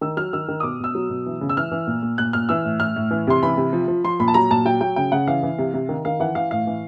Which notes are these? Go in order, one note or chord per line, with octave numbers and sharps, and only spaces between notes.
D#3 E6
F#3 F6
D#3 E6
D#3
D#6
B2 D6
B2 E6
F#3
B2
E3
C#3
E6
E3 F6
E3
A#2
A#2
A#2 F#6
A#2 F6
E3 E6
A2
A2 F6
A2
E3
C3 C6
E3 B5
C3
F3
F3
F3 C6
A#2 B5
A5
F#3 A#5
A#2 A5
F#3 G5
F#3 G5
C#3 G5
C#3 F#5
E3 F5
E3
C3
C3
D#3
D#3 F5
E3 F#5
E3 F5
A2 F5
E3